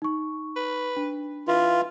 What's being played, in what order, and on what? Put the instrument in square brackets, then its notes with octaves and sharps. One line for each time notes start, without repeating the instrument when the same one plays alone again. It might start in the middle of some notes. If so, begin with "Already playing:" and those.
[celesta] D#4 C#6
[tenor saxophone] B4
[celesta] D4
[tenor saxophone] E3 [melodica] F4